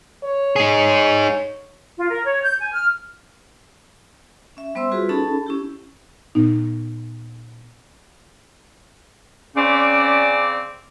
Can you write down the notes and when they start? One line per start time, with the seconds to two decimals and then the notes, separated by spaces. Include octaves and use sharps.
0.24 C#5
0.56 D#4 G#4
1.98 F4
2.11 A#4
2.26 C#5
2.43 G6
2.60 G#5
2.74 F6
4.57 C#4 E5
4.75 G3 B3 C5 E5 C6 E6
4.91 F4 F#4 G#4 B4
5.09 C#4 D#4 G#4 A4 A5 B5
5.46 C#4 E4 G4
6.35 A#2 B3 D#4
9.56 C#3 C4 C#4 D5